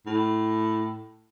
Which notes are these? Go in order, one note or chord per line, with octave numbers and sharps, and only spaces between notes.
A2